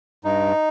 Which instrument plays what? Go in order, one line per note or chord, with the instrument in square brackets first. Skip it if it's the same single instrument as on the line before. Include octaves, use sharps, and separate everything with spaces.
[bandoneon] G2 D#4